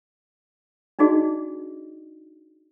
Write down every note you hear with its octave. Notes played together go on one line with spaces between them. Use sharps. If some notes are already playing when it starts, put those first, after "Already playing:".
D4 D#4 F#4 G#4 D5 D#5